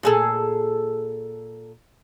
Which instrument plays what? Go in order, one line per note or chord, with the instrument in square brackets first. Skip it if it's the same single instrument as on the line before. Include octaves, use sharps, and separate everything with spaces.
[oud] A#2 G#4 A4